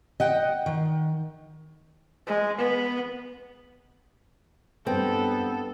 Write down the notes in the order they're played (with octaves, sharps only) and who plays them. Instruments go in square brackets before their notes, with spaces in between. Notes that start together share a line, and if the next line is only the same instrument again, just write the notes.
[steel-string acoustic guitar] D#5 F#5 G5
D#3
[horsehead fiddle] G#3
B3
[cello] G2 [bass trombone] B3 [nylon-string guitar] C4 [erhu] A4